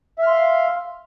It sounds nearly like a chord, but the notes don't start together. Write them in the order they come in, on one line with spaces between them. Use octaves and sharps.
E5 F6 C6 F5